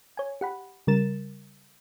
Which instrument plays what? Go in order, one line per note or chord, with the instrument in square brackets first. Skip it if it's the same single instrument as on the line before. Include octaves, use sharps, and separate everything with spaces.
[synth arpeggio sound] C#5 G#5
G4 F#5 B5
C#3 G3 A#4 A6 E7